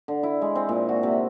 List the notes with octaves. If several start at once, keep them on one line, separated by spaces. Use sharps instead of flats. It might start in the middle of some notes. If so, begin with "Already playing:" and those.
D3
E4
G#3
C4
A#2
F#4
C3